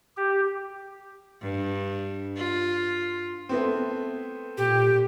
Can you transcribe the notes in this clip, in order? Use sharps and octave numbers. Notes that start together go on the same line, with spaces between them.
G4
G2
F4
A3 B3 C4
A#2 G4